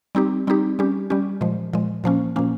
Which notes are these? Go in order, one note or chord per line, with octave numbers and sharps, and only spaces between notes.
G3 C4 D#4 G4
G3 C4 D#4 G4
G3 C#4 G4
G3 C#4 G4
A#2 F3 G#3
A#2 F3 G#3
A#2 F3 A#3 C#4
A#2 F3 A#3 C#4